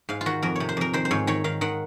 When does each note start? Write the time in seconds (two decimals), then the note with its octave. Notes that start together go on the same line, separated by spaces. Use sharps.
0.09 G#2 F5
0.21 F4
0.26 D#3 F#4
0.42 F2 A#4
0.56 C3 C#5
0.69 C5
0.77 F2 A#4
0.93 D#3 C5
1.05 C5
1.11 G#2 C#5
1.27 D#3 C#5
1.44 D#3 F5
1.61 D#3 F#5